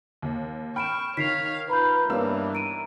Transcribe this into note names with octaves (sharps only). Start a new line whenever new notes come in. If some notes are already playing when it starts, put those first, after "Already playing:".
D#2
G5 B5 C#6 F6 D7 E7
D#3 C#5 F5 B6 C7 F7
F4 B4 A#5 B5 G6
G2 D#3 E3 A#3 B3 A#4 C#5 E6
A#5 D7 D#7